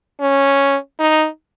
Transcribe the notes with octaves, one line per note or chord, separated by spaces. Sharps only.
C#4
D#4